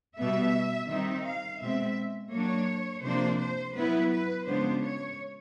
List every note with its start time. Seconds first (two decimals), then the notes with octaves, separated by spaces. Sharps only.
0.17 B2 G3 B3 E5
0.89 D#3 G3 C4 D#4 E5
1.24 F5
1.60 B2 G#3 C4 E5
2.32 F#3 A#3 D4 C#5
3.03 C3 F3 A#3 D4 C5
3.39 C5
3.75 F#3 B3 E4 B4
4.11 B4
4.47 C#3 F3 G#3 B3 D4 C5
4.83 C#5